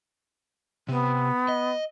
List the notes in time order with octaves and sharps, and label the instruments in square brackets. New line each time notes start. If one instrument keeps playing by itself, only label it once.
[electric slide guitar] C3 [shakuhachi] B3
[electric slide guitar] D#5